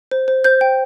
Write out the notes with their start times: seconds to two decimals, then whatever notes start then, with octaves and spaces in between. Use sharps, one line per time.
0.11 C5
0.28 C5
0.44 C5 G6
0.61 G5